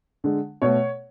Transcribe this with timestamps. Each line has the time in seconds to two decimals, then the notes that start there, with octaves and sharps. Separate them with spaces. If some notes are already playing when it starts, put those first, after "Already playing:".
0.24 D3 G#3
0.62 B2 A3 C#5